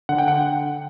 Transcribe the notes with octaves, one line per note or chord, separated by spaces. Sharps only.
D3 F#5
G5
F#5